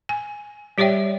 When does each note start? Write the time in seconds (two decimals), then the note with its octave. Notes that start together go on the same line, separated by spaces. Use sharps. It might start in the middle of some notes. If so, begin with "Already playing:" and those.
0.09 G#5
0.78 G3 G4 C#5 D5 E5 G5